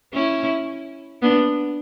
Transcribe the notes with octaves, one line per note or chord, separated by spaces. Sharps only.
C#4 E4
B3 D4